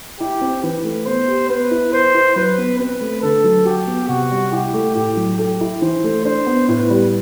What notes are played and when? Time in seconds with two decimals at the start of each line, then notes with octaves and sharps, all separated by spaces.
0.20 E4 G4
0.41 C4
0.63 E3 B4
0.84 A3
1.06 B3 C5
1.28 G4
1.50 B3 B4
1.71 E4
1.93 B4 C5
2.14 E4
2.36 F#3 B4
2.58 B3
2.79 C4 B4
3.01 A3
3.22 D3 A4
3.44 F#3
3.65 F#4 G4
3.87 B3
4.09 C3 F#4
4.31 G3
4.52 E4 G4
4.74 A3
4.95 A2 G4
5.17 F#3
5.39 G4 A4
5.61 E4
5.82 E3 C5
6.04 A3
6.25 D4 C5
6.47 B3
6.68 A2 B4
6.90 G3